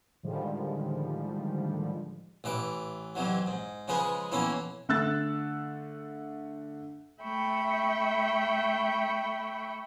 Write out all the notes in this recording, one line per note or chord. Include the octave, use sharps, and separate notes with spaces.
A2 D3 D#3 F3 G3 G#3
A1 E3 B4 D6
F2 C3 E3 F#3
G#2
C#3 F3 G#3 G#4 B4
F2 B2 E3 A#3 C#4 E4
D3 A3 E6 F#6 A6
A3 E5 G5 B5 C#6